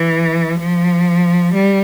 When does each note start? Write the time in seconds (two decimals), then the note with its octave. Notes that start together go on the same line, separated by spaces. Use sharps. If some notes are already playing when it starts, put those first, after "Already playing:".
Already playing: E3
0.59 F3
1.54 G3